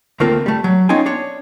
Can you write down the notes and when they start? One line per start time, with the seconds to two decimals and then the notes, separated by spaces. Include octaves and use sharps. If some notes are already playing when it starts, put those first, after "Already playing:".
0.20 D2 A3 A#3 C4 F4 A#4
0.46 G3 A3
0.64 F#3
0.89 B3 C#4 D#4 F4 G5 G#5
1.06 D4 C#5